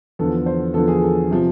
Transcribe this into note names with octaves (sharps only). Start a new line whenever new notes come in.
E2 D3 F3 A4
C5
E2 D3 F3 A4
G#4
A4
C3 F3